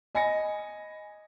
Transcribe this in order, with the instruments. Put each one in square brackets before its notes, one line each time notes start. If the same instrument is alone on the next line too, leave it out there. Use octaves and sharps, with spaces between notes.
[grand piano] D#5 G#5 B5 A#6 C#7